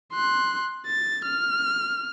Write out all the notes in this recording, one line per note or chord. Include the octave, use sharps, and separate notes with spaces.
C6 F#6
A6
F6